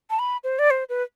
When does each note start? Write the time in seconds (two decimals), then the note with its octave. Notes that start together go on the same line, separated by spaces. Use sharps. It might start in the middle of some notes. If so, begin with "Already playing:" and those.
0.10 A5
0.19 B5
0.44 C5
0.59 D5
0.71 C5
0.89 B4